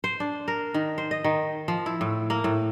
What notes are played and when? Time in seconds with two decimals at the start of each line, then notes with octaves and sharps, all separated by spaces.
0.04 C5
0.20 D4
0.48 A#4
0.74 D#3
0.98 C5
1.11 D#5
1.24 D#3
1.68 F3
1.86 E4
2.01 A2
2.30 A#3
2.44 A2